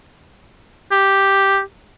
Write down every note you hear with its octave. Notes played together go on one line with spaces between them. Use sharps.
G4